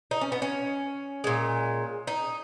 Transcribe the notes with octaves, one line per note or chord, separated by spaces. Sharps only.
D#4
C#4
B3
C#4
A#2 G#3
D#4